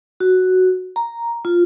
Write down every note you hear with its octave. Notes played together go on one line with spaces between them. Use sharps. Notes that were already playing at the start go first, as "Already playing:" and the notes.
F#4
A#5
F4